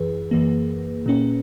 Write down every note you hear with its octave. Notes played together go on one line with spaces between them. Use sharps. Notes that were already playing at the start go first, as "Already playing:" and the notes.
Already playing: F#2 E3 G#4 B4
F#2 E3 A#3
A#2 A#3 C#4